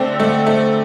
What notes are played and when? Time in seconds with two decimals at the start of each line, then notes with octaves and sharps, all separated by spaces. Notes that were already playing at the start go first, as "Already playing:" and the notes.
Already playing: D3 A3 C4
0.20 A3
0.46 A3